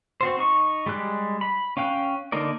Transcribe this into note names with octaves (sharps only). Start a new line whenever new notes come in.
C4 F#4 C5
D#4 C#6
G3 G#3 G4 F#6
B5
C#4 F5 G5 F#6
D3 A#3 D#4 A#4 D5